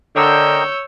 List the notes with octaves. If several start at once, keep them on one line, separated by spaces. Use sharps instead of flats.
D3 A#4 C#5 D#5 G5 E6 G6